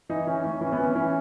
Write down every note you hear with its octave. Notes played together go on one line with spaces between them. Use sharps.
E3 D#4
E3 C#4
A2 C#4
E3 C#4
B3
E3
C#4
E3 C#4